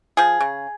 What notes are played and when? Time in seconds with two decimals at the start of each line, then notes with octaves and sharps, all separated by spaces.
0.17 F3 G#4
0.41 C#3